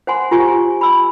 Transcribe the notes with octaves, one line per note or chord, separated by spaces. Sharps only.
C5 F#5 G#5 C6
F4 G4 G#5 C#6
B5 E6